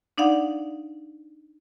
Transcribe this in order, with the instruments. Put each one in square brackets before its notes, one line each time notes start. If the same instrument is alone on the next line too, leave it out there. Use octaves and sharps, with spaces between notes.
[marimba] D4 D#4 D5 F5 F#5